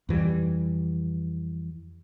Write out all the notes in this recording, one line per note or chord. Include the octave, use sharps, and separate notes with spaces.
F2 E3 G3